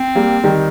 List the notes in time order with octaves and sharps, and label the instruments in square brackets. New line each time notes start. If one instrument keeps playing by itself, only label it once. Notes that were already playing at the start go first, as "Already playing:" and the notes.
Already playing: [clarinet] C4
[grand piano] G3 A#3
D#3 G3